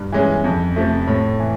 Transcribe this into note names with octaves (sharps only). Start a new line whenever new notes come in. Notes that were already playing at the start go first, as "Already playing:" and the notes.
Already playing: G2
E3 G#3 C#4
F2
C3 F3 A3
A2
E3